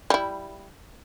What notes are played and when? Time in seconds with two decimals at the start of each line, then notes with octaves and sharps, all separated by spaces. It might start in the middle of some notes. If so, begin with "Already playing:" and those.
0.10 G3 E4